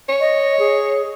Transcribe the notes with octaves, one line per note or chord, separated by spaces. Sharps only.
C#5
D#5
G#4